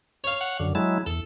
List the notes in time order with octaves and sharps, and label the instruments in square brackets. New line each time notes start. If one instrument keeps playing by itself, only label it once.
[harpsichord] C#5 F5
[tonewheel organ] F#5
F#2 D3
[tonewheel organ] F#3 G#3 E4 [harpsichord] A5
[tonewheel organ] E2 [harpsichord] A4